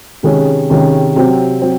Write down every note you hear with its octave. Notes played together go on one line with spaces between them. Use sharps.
C3 D#3 G#3 C#4
C3 D#3 G#3 C#4
C3 F#3 C4
F#3 C4